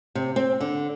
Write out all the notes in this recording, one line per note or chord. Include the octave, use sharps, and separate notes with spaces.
C3
C4
D3